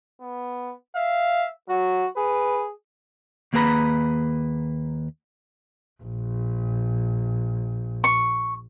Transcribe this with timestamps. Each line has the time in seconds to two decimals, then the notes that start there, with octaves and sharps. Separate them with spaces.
0.21 B3
0.96 E5 F5
1.69 F#3 F#4
2.17 G#4 B4
3.53 D#2 A#3 G#4 B4 A#5 B5
6.02 A#1
8.04 C#6